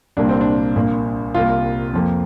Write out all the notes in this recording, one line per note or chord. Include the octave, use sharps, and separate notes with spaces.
C2 A#2 G3 A#3 D4
C4
D4
A#1 A#2 A#3
C2 C3 A#3 F4
F2 F3 A#3